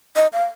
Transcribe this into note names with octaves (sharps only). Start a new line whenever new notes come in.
D#5
F5